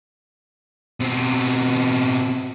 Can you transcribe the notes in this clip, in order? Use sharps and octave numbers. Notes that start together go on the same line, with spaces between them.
B2 C4